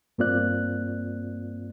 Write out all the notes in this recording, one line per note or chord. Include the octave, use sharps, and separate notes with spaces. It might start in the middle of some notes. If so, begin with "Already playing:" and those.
G2 A#3 C4 F4 D5 F#6